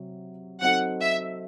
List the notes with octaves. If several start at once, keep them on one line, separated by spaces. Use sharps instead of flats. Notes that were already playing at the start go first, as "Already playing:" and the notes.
Already playing: C3 F#3
F#3 C4 D#4 F#4 A4 F#5
E5